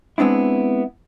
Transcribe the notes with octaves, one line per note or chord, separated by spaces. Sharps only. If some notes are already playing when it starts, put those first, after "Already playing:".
G#3 B3 C4 D4 E4